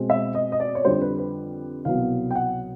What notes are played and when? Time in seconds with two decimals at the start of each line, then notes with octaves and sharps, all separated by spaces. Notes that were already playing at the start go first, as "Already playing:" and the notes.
Already playing: B2 G#3 C4
0.10 E5
0.35 D#5
0.52 D#5
0.60 D5
0.75 C#5
0.85 F2 D3 G3 C5
1.02 B4
1.18 B4
1.85 C2 B2 F#3 B3 F5
2.31 G5
2.35 F#5